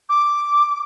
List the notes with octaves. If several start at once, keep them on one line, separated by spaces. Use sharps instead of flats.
D6